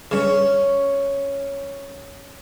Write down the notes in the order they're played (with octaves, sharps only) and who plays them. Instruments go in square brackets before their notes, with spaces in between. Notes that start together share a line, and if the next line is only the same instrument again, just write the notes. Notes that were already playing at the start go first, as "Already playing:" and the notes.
[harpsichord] G2 C#3 [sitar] C#4